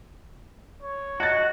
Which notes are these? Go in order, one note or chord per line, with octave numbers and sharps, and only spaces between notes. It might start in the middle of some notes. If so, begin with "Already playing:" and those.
C#5
F#4 D#5 F#6 A6